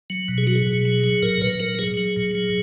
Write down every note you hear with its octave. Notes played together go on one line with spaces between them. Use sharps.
F#3
B2
G#4
F#3 F#4
G#4
B2
F#3
F#3
A#2 A#4
A#2 B4
F#3 A#4
F#3 G#4
F#3
A#2
F#3